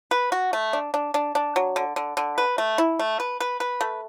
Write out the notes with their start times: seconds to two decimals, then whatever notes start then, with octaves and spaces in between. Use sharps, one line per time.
0.11 B4
0.32 F#4
0.53 A3
0.73 D4
0.94 D4
1.14 D4
1.35 D4
1.56 F#3
1.76 D3
1.96 D3
2.17 D3
2.38 B4
2.58 A3
2.78 E4
2.99 A3
3.20 B4
3.40 B4
3.60 B4
3.81 A3